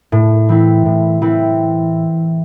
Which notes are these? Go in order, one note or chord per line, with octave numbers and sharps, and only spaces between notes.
A2
E3 C4 E4
A2
E3 C4 E4